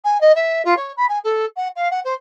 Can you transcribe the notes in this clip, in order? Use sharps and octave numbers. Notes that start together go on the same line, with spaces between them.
G#5
D#5
E5
F4
C#5
B5
G#5
A4
F#5
F5
F#5
C5